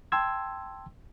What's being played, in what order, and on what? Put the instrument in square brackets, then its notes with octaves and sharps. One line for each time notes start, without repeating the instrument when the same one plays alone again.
[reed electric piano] G5 A5 C6 E6 G#6